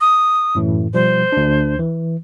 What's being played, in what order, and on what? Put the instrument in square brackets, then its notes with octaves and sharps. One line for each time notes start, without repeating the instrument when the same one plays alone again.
[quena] D#6
[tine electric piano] F#2 A2 E3
[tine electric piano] B2 F3 G3 [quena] C5
[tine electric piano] D2 D4
E3